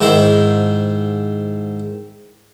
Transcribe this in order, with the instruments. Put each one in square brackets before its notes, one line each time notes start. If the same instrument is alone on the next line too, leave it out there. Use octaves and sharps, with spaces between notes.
[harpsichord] G#2 D#3 E4 C5